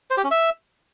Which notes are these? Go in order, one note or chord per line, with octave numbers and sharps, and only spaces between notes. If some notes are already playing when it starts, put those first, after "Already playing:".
C5
G4
C#4
E5